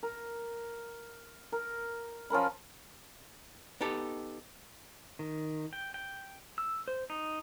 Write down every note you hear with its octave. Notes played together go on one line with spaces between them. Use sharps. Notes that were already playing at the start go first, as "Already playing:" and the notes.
A#4
A#4
F3 C#4 A#4 B5
B3 D#4 G4 A4
D#3
G5
G5
E6
C5
D#4